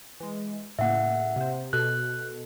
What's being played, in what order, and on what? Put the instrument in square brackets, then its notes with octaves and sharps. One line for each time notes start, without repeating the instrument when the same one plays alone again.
[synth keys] E3 G#3
[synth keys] A2 C#3 A#3 [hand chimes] E5 F#5
[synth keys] C3 C5
[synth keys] B2 A4 [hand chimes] F#6